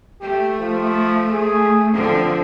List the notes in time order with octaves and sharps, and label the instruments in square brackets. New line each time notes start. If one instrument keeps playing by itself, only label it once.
[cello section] A3 [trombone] G4
[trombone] F3
G#4
[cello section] D3 F3 [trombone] C4